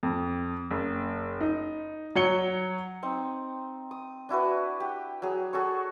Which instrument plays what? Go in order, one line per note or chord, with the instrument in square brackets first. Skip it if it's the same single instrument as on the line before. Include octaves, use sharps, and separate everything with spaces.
[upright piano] F2
F#1
D#4
F#3 C#5 C#7 G7
[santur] C4 D#4
D#6
D4 E4 F#4 B4
G4
F#3 G#4
F#4 G#4 A4 C#5